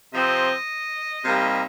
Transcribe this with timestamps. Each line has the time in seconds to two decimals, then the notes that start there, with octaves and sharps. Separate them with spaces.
0.14 C3 F3 C4 D#5
1.23 C3 G3 A#3 D#4